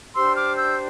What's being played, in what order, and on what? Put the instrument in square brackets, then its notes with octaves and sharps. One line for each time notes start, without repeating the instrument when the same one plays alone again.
[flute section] D4 G4 C5 C6 E6
D6 F6
E6 G6